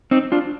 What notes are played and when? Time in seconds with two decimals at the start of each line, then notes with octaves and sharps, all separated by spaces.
0.11 C4 D#4
0.32 D4 F4